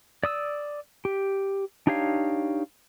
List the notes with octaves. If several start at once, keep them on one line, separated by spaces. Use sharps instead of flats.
D5 D#6 E6
G4
D4 D#4 G4 C#5 F5